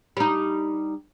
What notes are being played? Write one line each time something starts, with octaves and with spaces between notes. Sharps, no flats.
G3 D#4